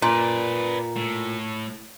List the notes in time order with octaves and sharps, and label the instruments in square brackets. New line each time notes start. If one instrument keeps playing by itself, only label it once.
[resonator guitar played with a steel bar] A#2 [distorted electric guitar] B4 D5
[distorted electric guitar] A2